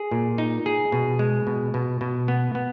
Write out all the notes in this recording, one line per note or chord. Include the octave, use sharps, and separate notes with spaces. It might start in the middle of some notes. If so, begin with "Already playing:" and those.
Already playing: G#4
A#2
D#4
G#4
B2
G#3
B2
B2
B2
B3
B3